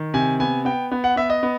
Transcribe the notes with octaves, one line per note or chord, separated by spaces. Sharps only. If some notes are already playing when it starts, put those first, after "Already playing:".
Already playing: D#3
C3 G#5
B3 G#5
B3 G5
B3
F#5
B3 E5
D#5
B3